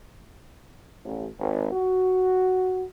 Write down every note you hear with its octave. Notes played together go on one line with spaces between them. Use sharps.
A1
G#1
F#4